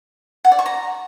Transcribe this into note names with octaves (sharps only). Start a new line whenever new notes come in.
F#5
D5
C#6
A#5